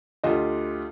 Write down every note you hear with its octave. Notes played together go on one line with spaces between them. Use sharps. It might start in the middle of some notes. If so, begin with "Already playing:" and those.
D2 F4 G4 D#5